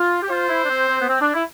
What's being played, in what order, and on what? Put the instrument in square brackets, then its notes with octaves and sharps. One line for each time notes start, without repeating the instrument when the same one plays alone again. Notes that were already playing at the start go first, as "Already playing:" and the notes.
Already playing: [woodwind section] F4
G4
[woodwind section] F4 [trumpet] C5
[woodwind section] E4
D4
C4
C4
B3
C4
D4
E4